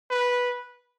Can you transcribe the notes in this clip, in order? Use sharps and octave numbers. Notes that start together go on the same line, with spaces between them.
B4